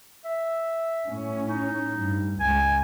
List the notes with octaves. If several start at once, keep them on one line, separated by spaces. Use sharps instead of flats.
E5
A2 C#4
D#4
G2
C#2 G#3 G#5